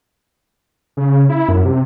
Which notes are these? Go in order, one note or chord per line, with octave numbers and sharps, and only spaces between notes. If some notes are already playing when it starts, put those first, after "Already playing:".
C#3
E4
F#2
C3